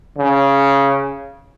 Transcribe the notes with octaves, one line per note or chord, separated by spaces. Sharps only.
C#3